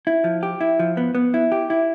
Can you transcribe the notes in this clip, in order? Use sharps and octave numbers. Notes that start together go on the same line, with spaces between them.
E4
F3
G4
E4
F3
B3
B3
E4
G4
E4